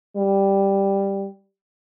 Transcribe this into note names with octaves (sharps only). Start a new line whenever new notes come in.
G3